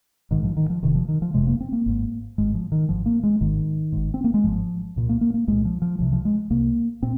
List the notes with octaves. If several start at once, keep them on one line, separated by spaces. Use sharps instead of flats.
A#1 G#2 D#3
F3
D#3
F3
F1 F2 C3 D#3
F3
D#3
F3
F1 F2 C3 G#3
A#3
C4
A#3
G#1 G#2
G#1 G#2 G#3
F3
D#3
G#1 G#2 F3
A#3
G#3
G#1 G#2 D#3
G#1 G#2
C4
A#3
G#3
G#1 G#2 F3
C2 A#2
A#3
A#3
A#3
C2 A#2 G#3
F3
F3
C2 C3 F3
F3
G#3
C2 C3 A#3
A#2 C4